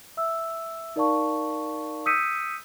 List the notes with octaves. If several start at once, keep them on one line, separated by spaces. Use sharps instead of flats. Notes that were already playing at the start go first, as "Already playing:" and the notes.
E5 E6
D#4 A#4 D5 F5 A5 C#6
D#6 E6 G6 B6 C#7 D#7